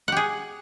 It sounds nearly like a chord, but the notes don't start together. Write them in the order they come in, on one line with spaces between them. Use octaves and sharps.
F#5 G4 G#4